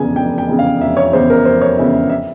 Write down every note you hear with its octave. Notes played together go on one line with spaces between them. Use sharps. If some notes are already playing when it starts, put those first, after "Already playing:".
Already playing: F1 E2 C#3 G#5
F1 G5
G5
E2 C#3
F5
F1 E5
C#5
E2 C#3 C5
A#4
F1 C5
C#5
E2 C#3 E5
E5
E5